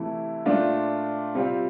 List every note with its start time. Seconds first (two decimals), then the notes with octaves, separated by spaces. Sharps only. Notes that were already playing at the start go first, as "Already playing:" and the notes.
Already playing: C3 E3 A3 E4
0.46 A#2 A3 D4 F4
1.35 C3 G3 C4 F4